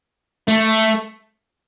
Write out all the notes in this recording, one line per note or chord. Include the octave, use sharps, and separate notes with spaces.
A3